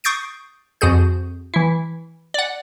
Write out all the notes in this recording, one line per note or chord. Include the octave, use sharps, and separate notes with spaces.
C#6 D#6 G6 A6 C7 D7
F2 F#4 G#4 G6
E3 E4
D5 F#5